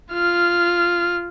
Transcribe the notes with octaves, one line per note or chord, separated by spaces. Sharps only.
F4 F6